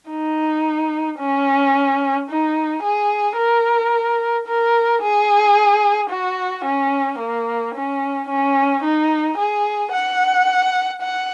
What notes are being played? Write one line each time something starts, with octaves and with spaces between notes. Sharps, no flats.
D#4
C#4
D#4
G#4
A#4
A#4
G#4
F#4
C#4
A#3
C#4
C#4
D#4
G#4
F#5
F#5